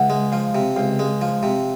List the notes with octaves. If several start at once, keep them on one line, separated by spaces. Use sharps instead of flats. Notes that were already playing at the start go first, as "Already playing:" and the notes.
Already playing: C#2 E5 F#5
G#3
F3 F5 G5
C3
C#2 F5 G5
G#3
F3
C3